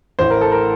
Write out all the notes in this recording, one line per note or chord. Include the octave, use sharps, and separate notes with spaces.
A1 A2 E3 C5
A#4
A4
A#4